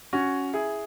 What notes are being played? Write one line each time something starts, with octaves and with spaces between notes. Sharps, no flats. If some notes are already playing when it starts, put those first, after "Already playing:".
C#4 F#4
E4 G#4